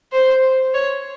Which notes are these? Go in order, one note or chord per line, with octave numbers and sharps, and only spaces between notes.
C5
C#5